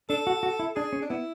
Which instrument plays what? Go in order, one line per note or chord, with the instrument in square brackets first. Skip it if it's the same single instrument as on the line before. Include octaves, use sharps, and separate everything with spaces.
[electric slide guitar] D4 [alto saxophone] A4
[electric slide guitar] F#4
F#4
E4
[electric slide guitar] D4 [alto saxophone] G#4
[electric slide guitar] C#4
[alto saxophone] D4
[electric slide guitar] B3 [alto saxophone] E4